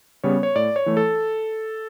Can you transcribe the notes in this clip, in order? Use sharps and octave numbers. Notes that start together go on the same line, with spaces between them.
C#3 G3 B3 C#5
C#5
A2 D5
C#5
E3 A3
A4